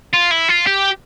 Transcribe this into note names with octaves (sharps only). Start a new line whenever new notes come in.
F4
E4
F4
G4